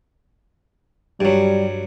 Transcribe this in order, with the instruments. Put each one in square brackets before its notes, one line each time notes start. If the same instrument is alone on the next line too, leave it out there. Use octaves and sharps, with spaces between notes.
[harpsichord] G2 F#3 [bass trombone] G3